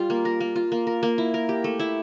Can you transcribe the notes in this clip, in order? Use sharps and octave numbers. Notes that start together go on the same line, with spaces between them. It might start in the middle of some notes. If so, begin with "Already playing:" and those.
Already playing: G3 F4
A#3
A#4
A#3
F4
A#3
A#4
A#3
E4
A#4
G4
A3
E4